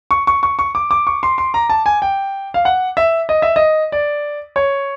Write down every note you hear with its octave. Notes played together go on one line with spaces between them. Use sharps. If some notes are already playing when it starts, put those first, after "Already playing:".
C#6
C#6
C#6
C#6
D6
D6
C#6
C6
C6
A#5
A5
G#5
G5
F5
F#5
E5
D#5
E5
D#5
D5
C#5